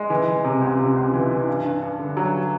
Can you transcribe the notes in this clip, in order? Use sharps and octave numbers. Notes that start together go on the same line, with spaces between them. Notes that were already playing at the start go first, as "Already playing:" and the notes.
Already playing: G#3
E3
E3
C3
C#2
C3
C#2
E3
E3
G2
G2
G2
D3
F#3